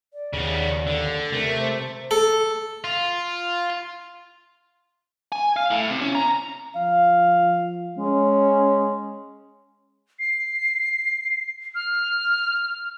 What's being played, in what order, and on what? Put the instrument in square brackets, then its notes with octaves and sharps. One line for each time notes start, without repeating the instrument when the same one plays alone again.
[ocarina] D5
[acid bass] D#2 [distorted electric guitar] C#3 B3
[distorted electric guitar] D3
[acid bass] C3 [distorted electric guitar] A3 [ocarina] A#4
[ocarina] C5
[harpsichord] A4
[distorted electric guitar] F4
[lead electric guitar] G#5
F5
A2
C3
C#4
A#5
[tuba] F3 [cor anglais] F5
[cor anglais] G#3 [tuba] C#4
[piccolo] C7
F6